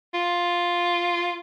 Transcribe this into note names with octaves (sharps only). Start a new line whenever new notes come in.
F4